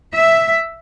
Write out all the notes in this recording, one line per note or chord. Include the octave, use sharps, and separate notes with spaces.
E5